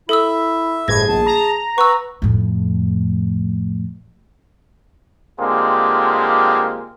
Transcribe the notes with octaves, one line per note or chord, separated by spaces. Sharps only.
E4 A4 E5 D#6 E6
G1 A2 G#4 G#6 A#6
A#1 A5
A#5
B4 F#5 C#6 E6
F2 A2
D3 G#3 A#3 C4 F4 G4